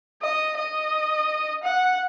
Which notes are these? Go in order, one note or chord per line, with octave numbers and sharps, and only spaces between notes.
D#5
D#5
F#5